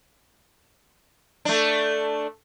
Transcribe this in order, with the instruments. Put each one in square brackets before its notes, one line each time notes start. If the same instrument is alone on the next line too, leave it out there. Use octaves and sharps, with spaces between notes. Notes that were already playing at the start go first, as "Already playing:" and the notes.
[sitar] A3 D4